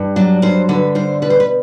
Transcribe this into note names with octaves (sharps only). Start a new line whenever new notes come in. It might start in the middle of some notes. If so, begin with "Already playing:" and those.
Already playing: G2
F#3 D4
G2 C5
D3 B4
G2 C5
B2 B4
C5
B4